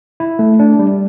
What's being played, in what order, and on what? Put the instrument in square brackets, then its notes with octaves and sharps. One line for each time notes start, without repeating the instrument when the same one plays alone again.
[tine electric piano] E4
A3
D4
G3